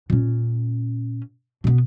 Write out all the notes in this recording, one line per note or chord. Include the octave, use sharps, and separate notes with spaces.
A#2 C#4
B2 B3